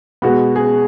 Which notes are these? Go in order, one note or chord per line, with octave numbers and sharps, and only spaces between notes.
B2 G#3 B3 F#4
G#4